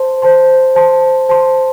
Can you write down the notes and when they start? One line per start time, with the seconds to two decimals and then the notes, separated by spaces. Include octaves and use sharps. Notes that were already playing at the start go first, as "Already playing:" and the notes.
Already playing: C5 A5 C6
0.22 C5 A5 C6
0.75 C5 A5 C6
1.29 C5 A5 C6